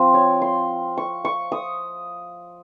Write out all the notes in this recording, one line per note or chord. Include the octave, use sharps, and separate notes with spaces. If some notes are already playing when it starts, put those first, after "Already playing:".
Already playing: F3 C4 F4
C#5
C6
C#6
C#6
D#6